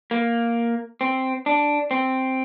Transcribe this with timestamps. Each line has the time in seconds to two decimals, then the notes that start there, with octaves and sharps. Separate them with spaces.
0.11 A#3
1.01 C4
1.46 D4
1.91 C4